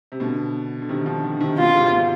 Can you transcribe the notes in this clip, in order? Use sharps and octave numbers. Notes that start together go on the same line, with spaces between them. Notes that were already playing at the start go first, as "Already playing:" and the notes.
C3
B2 D3
D3
C3 D#3
D3 F3
D3 F3
C3 D#3
B2 D3 F4
G#2 C3
B2